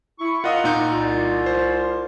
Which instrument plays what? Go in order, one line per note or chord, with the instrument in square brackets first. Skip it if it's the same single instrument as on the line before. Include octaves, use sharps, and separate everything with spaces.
[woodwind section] E4 C#6
[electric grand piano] F4 D#5 D#6 [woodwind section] A#4 F5 F#5
[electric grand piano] A#2 D#4 G6
[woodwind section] C2 F4
[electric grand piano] C5